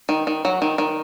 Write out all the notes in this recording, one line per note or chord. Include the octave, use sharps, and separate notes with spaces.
D#3
D#3
F#3
D#3
D#3